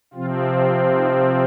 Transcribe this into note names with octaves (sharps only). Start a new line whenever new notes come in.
C3 F3 C4 F4
F4
D#4